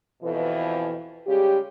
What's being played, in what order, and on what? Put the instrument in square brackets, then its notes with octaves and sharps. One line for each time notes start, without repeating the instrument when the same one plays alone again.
[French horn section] F2 B2 E3
C#3 G3 G#3 G4